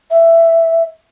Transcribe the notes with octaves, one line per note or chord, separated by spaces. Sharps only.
E5